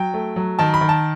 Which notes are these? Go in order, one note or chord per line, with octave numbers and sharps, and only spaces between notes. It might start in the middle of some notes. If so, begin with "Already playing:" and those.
Already playing: F#3 G5
A3
F#3
D#3 A5
B5
D#3
A5